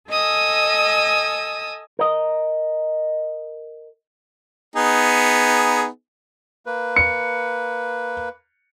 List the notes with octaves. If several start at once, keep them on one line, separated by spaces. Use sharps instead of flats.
A4 D#5 G#5 D#6 E6
A#4 D#5
B3 D#4 G#4
A#3 B4
C#7